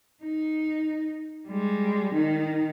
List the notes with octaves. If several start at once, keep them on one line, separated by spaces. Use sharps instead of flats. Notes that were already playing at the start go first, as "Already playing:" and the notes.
D#4
G3 G#3
D#3 D#4